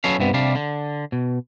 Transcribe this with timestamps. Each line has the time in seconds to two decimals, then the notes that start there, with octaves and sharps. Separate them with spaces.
0.04 F#3 B3 C#4 A4 F5
0.19 C2 G2 C3 B3
0.34 C3 G3 D4 F5
0.55 D3
1.12 B2